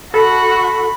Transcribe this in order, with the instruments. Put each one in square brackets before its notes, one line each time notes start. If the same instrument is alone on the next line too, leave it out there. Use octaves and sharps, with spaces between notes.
[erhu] F#4 [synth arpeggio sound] A4 [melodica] B5